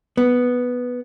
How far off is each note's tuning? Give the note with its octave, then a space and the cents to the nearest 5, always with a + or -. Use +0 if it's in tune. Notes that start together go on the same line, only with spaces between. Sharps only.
B3 +0